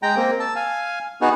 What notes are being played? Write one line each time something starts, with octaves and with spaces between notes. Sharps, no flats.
G#3 G5 A#5
A#3 C4
A5 E6
F5 G#5
B3 D#4 F#4 G#4